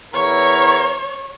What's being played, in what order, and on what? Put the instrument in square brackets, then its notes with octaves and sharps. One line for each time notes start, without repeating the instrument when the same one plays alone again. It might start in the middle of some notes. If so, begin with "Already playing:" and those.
[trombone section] E2 E4 A#4 [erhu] C#5